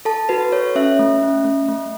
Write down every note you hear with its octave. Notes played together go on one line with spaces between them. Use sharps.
A4 A5
F#4 B4
A4 C#5
C#4 E5
A3
C#4
A3
A3